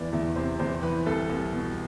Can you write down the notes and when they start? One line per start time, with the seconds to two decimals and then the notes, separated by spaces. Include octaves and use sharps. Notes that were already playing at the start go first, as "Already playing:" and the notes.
Already playing: E2 E3 D5
0.13 E2 E5
0.36 C3 C5
0.59 E2 C5
0.83 E3 B4
1.06 C2 A4
1.29 C2
1.53 B2